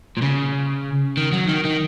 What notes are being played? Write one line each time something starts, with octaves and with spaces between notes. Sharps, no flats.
A#2
C#3
D#3
F#3
D#3
D#3